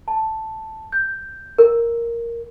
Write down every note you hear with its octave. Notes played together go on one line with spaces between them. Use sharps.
A5
G6
A#4